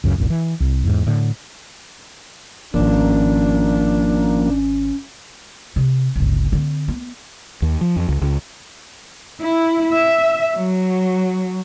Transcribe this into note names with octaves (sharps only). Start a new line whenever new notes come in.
C#2 F#2 C#3
F#1 C2 A#2
E3
C2
E2 G#2
A2 D3
G#1 D#3 F3 A#3 C#4 D4
C3
G1 C#2
D3 C4
B3
D#2
F3
F2
C#2
C#2
E4
E5
F#3